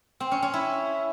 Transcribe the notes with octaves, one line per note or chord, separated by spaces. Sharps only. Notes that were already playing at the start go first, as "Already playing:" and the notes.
C4
C#4
C#4
E4